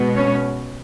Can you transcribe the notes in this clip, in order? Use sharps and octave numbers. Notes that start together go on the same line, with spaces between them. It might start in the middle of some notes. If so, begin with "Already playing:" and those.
Already playing: B2 G#3 B3
C#4 C#5